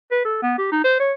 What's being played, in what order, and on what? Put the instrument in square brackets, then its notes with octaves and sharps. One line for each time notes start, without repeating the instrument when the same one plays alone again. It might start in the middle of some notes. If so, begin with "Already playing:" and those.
[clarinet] B4
A4
B3
G4
D#4
C5
C#5